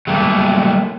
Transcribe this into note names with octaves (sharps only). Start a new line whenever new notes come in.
F#3 G3 A3 A#3